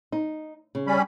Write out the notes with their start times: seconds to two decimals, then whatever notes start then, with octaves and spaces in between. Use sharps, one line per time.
0.12 D#4
0.75 C#3
0.87 G3 C#4 B5